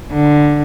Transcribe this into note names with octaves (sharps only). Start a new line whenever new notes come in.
D3